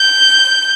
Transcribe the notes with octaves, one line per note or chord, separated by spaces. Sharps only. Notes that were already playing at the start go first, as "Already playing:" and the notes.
Already playing: G6